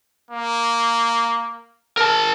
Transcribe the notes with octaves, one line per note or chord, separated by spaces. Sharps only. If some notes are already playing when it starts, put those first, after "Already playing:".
A#3
A#4 A5